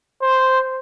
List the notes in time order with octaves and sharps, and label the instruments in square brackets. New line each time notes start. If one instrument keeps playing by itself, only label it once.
[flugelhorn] C5